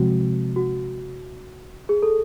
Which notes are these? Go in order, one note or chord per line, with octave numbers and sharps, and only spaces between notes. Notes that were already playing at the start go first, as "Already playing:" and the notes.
Already playing: C3 F3 G#3 C4 F#4
F#4
G#4
A4